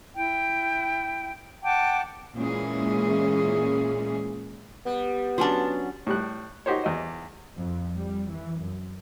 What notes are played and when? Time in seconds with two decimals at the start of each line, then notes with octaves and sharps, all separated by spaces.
0.16 E4 G5
1.64 F#5 G5 A5 D6
2.36 A#2 E3 G#3 C#4 G#4
4.86 G3 B3
5.38 F#3 C#4 D4 A5 C6
6.07 A2 G3 F#6
6.66 D#4 F#4 G4 C5 C#5
6.84 E2 D#5
7.58 F2
7.98 G3
8.33 E3
8.63 F#2